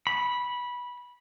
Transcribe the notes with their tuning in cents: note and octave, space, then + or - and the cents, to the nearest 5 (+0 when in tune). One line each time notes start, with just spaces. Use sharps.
B5 -15